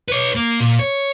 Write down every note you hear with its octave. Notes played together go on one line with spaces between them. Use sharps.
B4 C#5
A#3
A#2
C#5